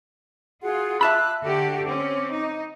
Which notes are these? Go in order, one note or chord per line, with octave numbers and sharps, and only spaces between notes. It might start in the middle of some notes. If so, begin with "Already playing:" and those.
F4 F#4 G#4 F#5
E5 A5 B5 D6 E6 F#6
D3 F#4 G4 A4
C4 C#4 D6
D#4